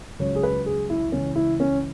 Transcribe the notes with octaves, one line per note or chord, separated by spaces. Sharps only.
C#2 C#3 F#3 C#5
G#4
B4
G#4
E4
C#2 C#3 E3 C#4
E4
C#4